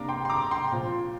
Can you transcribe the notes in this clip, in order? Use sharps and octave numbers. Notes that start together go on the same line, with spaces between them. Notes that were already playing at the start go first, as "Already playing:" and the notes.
Already playing: C3 A#3 D4 A#5 D6
G5 C6
C6
A#5 D6
G5 C6
A#2 F3 C4